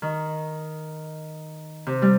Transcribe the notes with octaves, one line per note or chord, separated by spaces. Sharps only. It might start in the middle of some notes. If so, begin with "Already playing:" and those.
D#3
C3
G3